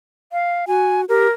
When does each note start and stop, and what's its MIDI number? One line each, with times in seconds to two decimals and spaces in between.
0.32 0.65 77
0.68 1.05 66
0.68 1.01 80
1.09 1.27 67
1.09 1.30 70